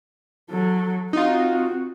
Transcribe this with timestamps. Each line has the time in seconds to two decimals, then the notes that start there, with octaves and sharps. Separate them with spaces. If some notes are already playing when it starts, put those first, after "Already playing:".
0.51 F#3 A4
1.13 C4 D#4 F4 F#4